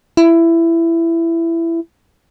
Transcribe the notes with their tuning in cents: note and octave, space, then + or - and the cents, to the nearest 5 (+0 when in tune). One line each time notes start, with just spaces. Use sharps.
E4 +15